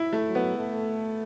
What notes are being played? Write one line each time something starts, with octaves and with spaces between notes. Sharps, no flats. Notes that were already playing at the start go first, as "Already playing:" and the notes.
Already playing: E4
A3
F#3
B3
A3